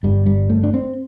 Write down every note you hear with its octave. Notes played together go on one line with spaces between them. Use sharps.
G1 G2 D3 G3
G3
A3
D4
C4